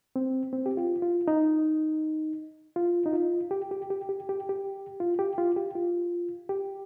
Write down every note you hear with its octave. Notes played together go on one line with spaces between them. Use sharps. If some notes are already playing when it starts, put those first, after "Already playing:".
C4
C4
G4
F4
F4
D#4
F4
D#4
F4
G4
G4
G4
G4
G4
G4
F4
G4
F4
G4
F4
G4